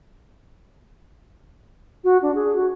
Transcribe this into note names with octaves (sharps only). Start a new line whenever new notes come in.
F#4
D4
G#4
F#4